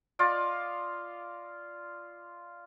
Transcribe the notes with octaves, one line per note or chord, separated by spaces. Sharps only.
F4 D5 D#5